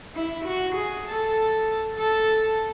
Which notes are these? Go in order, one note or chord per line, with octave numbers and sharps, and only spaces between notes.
E4
F#4
G#4
A4
A4